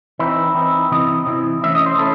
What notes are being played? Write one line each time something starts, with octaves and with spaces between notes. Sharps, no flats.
E3 C4 D#4 E4
E3 C4 D#4
C3 E3 C4 E4 D#5
C3 E3 C4 E4
E3 A3 C#4 E4 E5
D#5
C5
A3 C#4 E4 A4